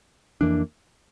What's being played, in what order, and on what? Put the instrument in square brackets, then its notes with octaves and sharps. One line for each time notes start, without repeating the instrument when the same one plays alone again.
[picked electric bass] F2 E3 A#3 D4